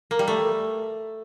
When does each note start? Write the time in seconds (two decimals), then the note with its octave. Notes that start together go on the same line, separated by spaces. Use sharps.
0.11 A#3
0.19 G3
0.28 A3